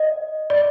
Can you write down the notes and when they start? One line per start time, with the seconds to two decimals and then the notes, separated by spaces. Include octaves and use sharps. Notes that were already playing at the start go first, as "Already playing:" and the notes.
Already playing: D#5
0.50 D5